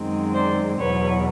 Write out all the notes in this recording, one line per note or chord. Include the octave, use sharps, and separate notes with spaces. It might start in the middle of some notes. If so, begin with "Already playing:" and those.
Already playing: F#2 D#3 G#3 C4
C5 D5
E2 B2 F#3 B4 C#5